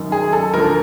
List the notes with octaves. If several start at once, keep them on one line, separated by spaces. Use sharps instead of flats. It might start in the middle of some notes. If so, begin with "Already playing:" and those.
Already playing: F#2 D#3
G#4
A4
D2 D3 F3 A#4